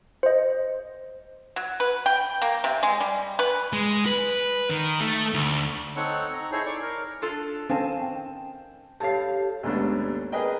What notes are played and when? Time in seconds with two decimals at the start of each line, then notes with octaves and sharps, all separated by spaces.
0.23 C5 D#5
1.56 F#3
1.80 B4
2.06 G5
2.42 A#3
2.64 C3
2.83 G#3
3.01 G3
3.39 B4
3.73 G#3
4.06 B4
4.70 D#3
5.00 A3
5.34 D2
5.96 C4 D#4 A4 C#5 F#5
6.33 A#5
6.52 D#4 E4 G#4 A4 C5 C#5
6.66 C#5 D5 C#6
6.82 A#4
7.22 D4 F4 A4
7.69 D#3 C4 C#4 F5 G#5 A5
8.01 G5
9.00 G2 G4 A4 C#5 F5 A5 C7
9.63 D#2 G#2 A3 B3 C#4 D4
10.32 G#4 A#4 B4 D#5 G5